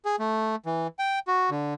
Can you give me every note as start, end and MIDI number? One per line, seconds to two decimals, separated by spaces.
0.05 0.16 68
0.19 0.56 57
0.66 0.87 52
0.99 1.19 79
1.28 1.50 66
1.51 1.74 50